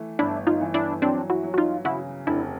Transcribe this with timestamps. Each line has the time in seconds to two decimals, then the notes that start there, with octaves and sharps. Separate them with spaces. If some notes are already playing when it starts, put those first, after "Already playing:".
Already playing: E3 A3
0.19 G1 D4 E4
0.47 D#4 F4
0.61 E3
0.74 D4 E4
1.02 F#3 C4 D4
1.30 E4 F#4
1.43 F#3
1.54 F#4
1.58 D#4 F4
1.85 C#3 E4 F#4
2.27 F1 D4 E4